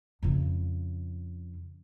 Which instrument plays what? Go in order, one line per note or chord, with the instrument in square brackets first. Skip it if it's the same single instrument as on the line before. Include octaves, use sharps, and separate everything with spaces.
[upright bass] F2 C#3